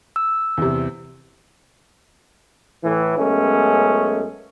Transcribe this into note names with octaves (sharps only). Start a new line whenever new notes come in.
E6
E2 C3
A2 E3
F#2 G#3 A3 B3 C#4